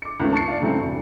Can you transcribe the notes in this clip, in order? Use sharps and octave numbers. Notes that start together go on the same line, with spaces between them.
D6 C#7
C#2 D#3 A3 B3 C#4
A5 C#6 A6 C7 C#7
D5 F5
A2 C#3 F#3 A3 C4
F1 D2